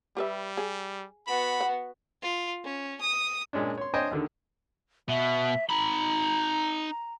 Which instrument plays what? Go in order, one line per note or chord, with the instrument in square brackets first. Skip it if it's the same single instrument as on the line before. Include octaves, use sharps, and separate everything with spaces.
[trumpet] G3 [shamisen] G4 B4 E5
[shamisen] G#4
[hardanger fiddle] B3 F#4 [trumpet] B5
[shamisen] F#5
[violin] F4
C#4
D#6
[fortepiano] A#2 G#3 C#4 D4
C#5 C6
D4 C5 C#5 D#5 G5 G#5
D#2 D3 D#3
[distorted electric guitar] B2 [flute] E5
[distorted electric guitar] D#4 B5 [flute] A#5